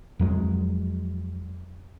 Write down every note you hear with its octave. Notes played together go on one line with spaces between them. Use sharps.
F2 F#3 G#3